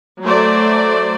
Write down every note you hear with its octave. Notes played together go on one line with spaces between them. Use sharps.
F#3 A3 C5 D5